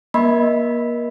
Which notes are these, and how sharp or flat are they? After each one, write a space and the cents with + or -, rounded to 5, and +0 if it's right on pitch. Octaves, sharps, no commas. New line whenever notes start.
A#3 +35 D#5 +0 B5 +0